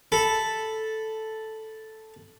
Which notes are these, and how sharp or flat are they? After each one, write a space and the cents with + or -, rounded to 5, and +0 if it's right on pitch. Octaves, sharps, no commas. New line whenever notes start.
A4 +0 B5 +0